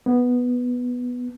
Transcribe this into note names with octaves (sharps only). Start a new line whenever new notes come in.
B3